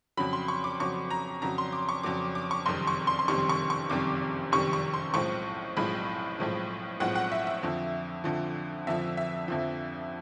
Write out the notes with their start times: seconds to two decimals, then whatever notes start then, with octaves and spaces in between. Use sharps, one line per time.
0.17 F2 C#3 F#3 B5
0.33 C6
0.48 C#6
0.64 D6
0.80 F2 C#3 F#3 C#6
1.10 A#5
1.42 F2 C#3 F#3 A#5
1.58 C6
1.72 D6
1.89 C#6
2.03 F2 C#3 F#3 D6
2.35 D6
2.51 C#6
2.66 F#1 F2 C3 D#3 G3 C6
2.87 C#6
3.07 C6
3.19 C6
3.28 F#1 F2 C3 D#3 G3 C#6
3.49 C#6
3.70 C#6
3.90 F#1 F2 C3 D#3 G3 D6
4.52 F#1 F2 C3 D#3 G3 C#6
4.73 C#6
4.94 C6
5.14 B1 A2 F3 G#3 C4 C#6
5.77 B1 A2 F3 G#3 C4 B5
6.38 B1 A2 F3 G#3 C4
7.00 B1 A2 F3 G#3 C4 F#5
7.15 F#5
7.32 E5
7.47 E5
7.63 F2 D3 F3
8.24 F2 D3 F3
8.87 F2 D3 F3 E5
9.17 E5
9.48 F2 D3 F3